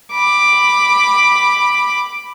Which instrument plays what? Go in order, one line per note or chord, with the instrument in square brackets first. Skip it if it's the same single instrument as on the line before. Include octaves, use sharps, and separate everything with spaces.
[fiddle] B5 D6